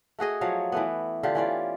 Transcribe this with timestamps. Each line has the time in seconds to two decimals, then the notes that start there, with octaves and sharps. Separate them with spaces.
0.19 A3 F#4 G#4 D#5
0.41 F3 F#3 C#5 F5
0.72 E3 A3 B3
1.23 D3 F4 G4
1.35 E3 C#4 F4 D5